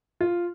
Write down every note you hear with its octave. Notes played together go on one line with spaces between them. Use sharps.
F4